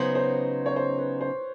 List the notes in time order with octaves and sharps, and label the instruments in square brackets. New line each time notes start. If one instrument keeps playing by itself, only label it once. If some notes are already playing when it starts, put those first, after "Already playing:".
Already playing: [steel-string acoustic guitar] C#3 F#3 B3 D#4 [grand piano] C5
[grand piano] C5
C#5
C5
B4
C5